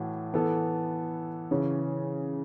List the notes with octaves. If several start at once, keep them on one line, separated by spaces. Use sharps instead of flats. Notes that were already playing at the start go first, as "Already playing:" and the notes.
Already playing: A2 E3 A3 F#4
E3 B3 A4
C#3 E3 C#4